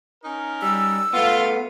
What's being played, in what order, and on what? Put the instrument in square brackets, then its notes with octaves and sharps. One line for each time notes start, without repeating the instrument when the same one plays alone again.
[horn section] C#4 D#4 A#4
[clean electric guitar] G3 [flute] E6
[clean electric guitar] A3 B3 [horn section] F4